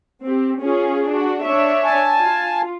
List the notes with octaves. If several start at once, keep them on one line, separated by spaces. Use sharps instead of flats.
C4 G4
C#4 F4 G#4
D4 F#4
D4 C#5 E5
G#5 A5
F4